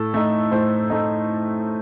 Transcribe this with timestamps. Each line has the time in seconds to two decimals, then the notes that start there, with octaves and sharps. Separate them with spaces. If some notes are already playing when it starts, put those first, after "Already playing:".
Already playing: A2 A4
0.14 A3 D#4
0.51 A2 C5
0.90 A3 D#4